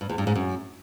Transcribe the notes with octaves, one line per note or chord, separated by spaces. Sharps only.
G2
E2
G2
G#2
F#2